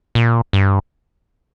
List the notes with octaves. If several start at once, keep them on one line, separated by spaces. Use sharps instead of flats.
A#2
G2